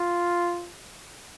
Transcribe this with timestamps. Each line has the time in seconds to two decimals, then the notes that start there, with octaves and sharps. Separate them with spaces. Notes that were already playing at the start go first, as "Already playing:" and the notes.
Already playing: F4